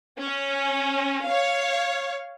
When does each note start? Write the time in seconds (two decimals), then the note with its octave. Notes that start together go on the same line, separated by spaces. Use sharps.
0.21 C#4
1.26 C#5 F5